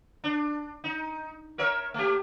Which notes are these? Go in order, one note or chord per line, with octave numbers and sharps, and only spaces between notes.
D4
D#4
A#4 C#5 E5
A3 G4